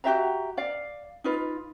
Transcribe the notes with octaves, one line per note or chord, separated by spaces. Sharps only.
F#4 G4 E5 A#5
D5 F5
D#4 F4 B4